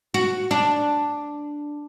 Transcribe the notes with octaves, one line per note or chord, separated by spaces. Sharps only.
F#4
D4